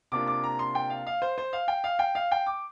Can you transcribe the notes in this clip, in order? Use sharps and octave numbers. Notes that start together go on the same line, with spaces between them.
C3 A#3 D4 F4 D6
D6
A#5
C6
G5
F5
F5
C5
C5
F5
G5
F5
G5
F5
G5
D6